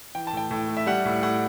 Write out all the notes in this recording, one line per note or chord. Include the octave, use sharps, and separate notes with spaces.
E3 G5
A5
A2 G5
A2
A3
E5
G3 F#5
A2
A2 F#5